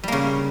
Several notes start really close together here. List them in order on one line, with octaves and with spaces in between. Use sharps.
G3 A#3 C#3